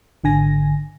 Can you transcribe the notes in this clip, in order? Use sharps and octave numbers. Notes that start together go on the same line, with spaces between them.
G#1 D3 G#5 A#6